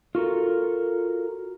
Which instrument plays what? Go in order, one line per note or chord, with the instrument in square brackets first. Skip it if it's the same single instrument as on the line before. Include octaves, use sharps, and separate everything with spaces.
[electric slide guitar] F4 F#4 A4 A#4